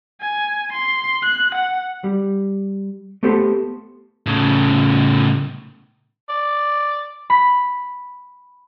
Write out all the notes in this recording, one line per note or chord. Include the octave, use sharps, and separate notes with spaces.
G#5
C6
F#6
F#5
G3
A3 B3 G4 A4 C5
A2 C#3
D5
B5 B6